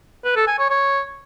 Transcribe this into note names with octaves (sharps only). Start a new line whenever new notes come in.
B4
A4
G#5
C#5
C#5